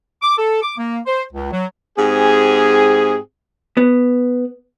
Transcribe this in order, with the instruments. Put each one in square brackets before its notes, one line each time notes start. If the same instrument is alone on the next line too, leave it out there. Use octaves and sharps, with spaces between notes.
[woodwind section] D6
A4
D6
A#3
C5
C#2
F#3
[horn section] G#2 C4 G4 G#4
[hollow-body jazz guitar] B3